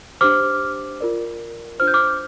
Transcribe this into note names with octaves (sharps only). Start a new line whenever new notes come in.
D4 G4 C5 D6 F6
F4 A#4 D5
D4 F4 C5 F6
G6
D6 F6